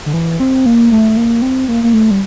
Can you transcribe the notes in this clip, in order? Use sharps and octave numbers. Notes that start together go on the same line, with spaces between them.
D3
E3
C4
A#3
A3
A#3
C4
A#3
A#3
A3
G3